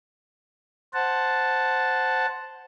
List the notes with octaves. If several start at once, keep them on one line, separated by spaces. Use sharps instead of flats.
C5 F#5 A5